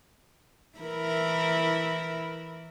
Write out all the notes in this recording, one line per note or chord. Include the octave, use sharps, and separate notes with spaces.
E3 E4 A#4